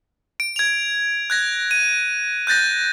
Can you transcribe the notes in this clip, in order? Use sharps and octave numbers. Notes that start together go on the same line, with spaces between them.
D7
G#6 F7
F#6 G#6 A#6
D#7
F#6 G6 A6 A#6